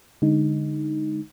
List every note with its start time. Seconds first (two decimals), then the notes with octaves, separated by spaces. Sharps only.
0.22 D3 G#3 D#4